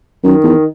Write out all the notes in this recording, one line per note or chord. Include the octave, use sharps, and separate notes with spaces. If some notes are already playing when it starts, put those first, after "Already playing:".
F#2 D#3
E2